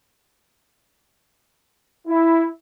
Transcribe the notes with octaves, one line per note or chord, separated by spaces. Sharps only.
E4